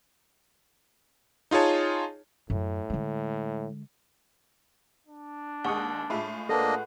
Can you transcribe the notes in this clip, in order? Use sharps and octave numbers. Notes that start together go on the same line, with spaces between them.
D#4 F4 G#4 C#5 A5
F#2 A2
D3 G#3
D4
D#2 G#3 F#5 C#6 D#6
A2 G#3 F4 E5 B5
A#3 D4 A4 B4 D#5 F#5